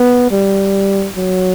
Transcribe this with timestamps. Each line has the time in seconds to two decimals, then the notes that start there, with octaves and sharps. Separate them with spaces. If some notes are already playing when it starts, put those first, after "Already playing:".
Already playing: B3
0.31 G3
1.17 F#3